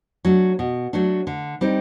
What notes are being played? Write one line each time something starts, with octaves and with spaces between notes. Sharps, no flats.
F#3 A3 D4
B2
F#3 A3 D4
D3
G3 C4 D#4